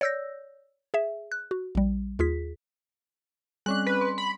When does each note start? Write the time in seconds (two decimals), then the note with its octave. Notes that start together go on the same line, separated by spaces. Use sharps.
0.01 C#5 D5 E6 G6 A#6
0.94 G#4 E5
1.32 F#6
1.51 F#4
1.75 A#1 G3
2.19 D#2 F4 G#4 B6
3.66 G3 C4 C#4 F#6
3.87 B4
4.01 C6
4.18 B5